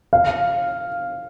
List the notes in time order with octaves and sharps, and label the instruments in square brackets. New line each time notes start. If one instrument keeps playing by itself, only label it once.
[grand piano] F5